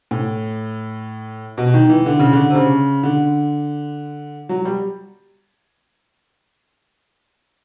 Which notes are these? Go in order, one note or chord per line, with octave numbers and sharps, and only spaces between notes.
A2
B2
D#3
E3
D3
C#3
D3
C3
C#3
D3
F#3
G3